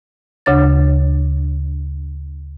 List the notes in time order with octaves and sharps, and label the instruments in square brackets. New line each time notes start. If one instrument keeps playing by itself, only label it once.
[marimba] D2 C#3 D4 C#5 A6